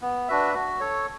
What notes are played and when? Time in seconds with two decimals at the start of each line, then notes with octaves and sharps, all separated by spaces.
0.02 B3
0.28 D4 F#4 B4 E5
0.54 F#4
0.80 A4 C#5